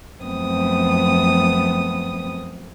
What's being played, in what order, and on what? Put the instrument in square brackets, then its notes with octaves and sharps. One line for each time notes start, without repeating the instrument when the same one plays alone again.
[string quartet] F#2 F3 A3 B3 C4 D#6